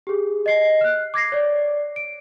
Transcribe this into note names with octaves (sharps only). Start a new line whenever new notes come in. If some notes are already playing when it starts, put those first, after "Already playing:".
G4 G#4
D#5 C7
F6 F#6
D6 G#6 A#6 C7
C#5 D5 D6
D7